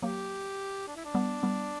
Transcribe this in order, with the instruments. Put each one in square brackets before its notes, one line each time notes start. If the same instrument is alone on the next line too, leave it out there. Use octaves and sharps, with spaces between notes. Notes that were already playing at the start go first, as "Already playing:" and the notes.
[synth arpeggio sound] F#3 A#3 [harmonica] G4
[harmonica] D4
E4
D4
[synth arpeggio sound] G3 B3
G3 B3